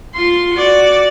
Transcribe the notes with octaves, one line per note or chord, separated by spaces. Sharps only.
F4 C6
F#4 D5